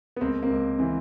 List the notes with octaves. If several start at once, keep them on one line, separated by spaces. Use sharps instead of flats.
B3
C#2 A#3 C4
A#3 C4
C#2
E3 C4